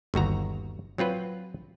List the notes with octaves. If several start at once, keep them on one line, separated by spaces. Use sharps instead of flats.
G1 D#2 F#4 A#5
F#3 C4 F4 B4